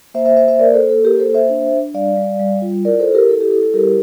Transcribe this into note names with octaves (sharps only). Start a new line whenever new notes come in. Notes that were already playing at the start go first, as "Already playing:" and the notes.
A#3 C5 E5
C5 E5
A#3 C5 E5
C5 E5
A#3 A#4 D5
A4 C5
A#3
A4
A#3 G4 A#4
A4 C5
A#3
C5 E5
D4
D4
G3 D5 F5
G3
G3
F4
E4 A#4 D5
A4 C5
E4
G4 A#4
E4 A4
G4
E4 A4
A4
G3 G4 A#4